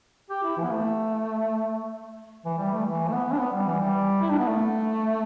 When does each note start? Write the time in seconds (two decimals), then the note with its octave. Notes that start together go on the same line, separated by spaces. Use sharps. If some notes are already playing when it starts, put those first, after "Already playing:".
0.30 G4
0.44 E4
0.57 E3
0.64 B3
0.71 A3
2.45 E3
2.58 G3
2.72 A3
2.86 E3
3.08 A3
3.12 B3
3.32 D4
3.39 B3
3.53 G3
3.66 E3
3.80 G3
4.22 E4
4.30 D4
4.39 B3
4.47 A3